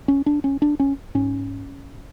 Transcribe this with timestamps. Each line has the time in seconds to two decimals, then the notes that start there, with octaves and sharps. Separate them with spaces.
0.08 C#4
0.26 D4
0.44 C#4
0.62 D4
0.80 C#4
1.15 G#2 C#4